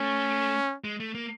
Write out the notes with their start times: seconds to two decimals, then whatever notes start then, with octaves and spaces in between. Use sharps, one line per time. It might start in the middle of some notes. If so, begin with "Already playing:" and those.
Already playing: A3 C#4
0.84 G#3
1.00 A3
1.15 A#3